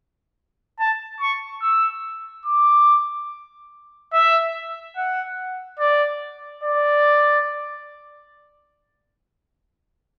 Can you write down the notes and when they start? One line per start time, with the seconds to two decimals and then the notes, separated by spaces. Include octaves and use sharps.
0.79 A5
1.20 C#6
1.62 E6
2.46 D6
4.13 E5
4.96 F#5
5.79 D5
6.64 D5